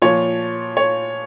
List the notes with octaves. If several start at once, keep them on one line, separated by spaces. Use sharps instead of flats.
A#2 F3 C#5
C#5